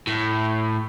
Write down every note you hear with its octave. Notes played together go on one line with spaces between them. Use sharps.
A2